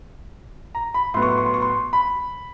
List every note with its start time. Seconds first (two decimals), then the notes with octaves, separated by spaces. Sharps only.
0.75 A#5
0.94 B5
1.14 A2 F#3 B3 C6
1.22 C#6
1.30 C6
1.38 C#6
1.46 C6
1.54 C#6
1.62 C6
1.93 B5